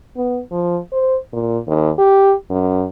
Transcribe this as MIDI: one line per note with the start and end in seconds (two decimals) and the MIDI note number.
0.17 0.40 59
0.52 0.79 53
0.92 1.17 72
1.33 1.58 46
1.68 1.90 39
1.98 2.34 67
2.51 2.86 42